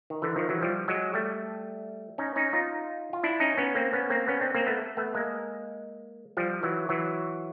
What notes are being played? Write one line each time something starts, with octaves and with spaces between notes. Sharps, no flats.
D#3
D3 E3
D#3 F3
E3 F#3
F3 G3
F#3 G#3
G3 A3
C#4 D#4
C#4 D#4
D#4 F4
F4
D4 E4
C#4 D#4
B3 C#4
A#3 C4
B3 C#4
A#3 C4
B3 C#4
C4 D4
A#3 C4
A3 B3
A3 B3
G#3 A#3
F3 G3
E3 F#3
E3 F#3